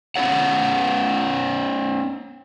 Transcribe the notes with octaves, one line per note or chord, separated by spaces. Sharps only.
B3 C#4 F4 A4 C#5 F#5